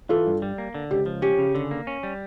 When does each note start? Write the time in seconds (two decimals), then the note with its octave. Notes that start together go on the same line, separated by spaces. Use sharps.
0.09 E3 F4 A4
0.27 G2
0.42 G3
0.58 A#3
0.75 D3
0.91 C#2 G4
1.06 F3
1.22 C#4 G4
1.39 C#3
1.55 D3
1.71 A#3
1.87 C#4
2.03 G3